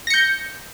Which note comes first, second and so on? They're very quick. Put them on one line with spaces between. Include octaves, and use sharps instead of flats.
A#6 C#7 G6